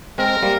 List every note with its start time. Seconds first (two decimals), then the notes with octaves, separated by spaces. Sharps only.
0.18 G#3 C4 A#4
0.43 G3 A#3